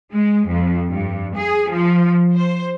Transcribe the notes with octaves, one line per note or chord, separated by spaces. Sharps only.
G#3
F2
G2
G#4
F3
C5